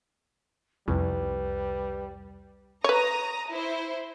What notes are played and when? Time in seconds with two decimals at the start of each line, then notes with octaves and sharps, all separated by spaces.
0.88 C2 F2 G3 B4
2.84 B4 C#5 A#5 D#6
3.51 E4 C5